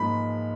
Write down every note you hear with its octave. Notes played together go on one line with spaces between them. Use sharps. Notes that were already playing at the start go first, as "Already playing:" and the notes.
Already playing: G#2 F3 A#3 B5